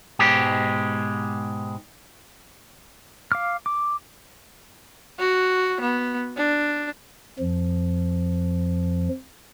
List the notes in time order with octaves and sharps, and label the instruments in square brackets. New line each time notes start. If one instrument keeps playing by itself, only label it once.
[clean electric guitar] G#2 B2 G#3 G4
[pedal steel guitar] F5 D6 F6
D6
[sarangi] F#4
B3
D4
[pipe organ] F2 F3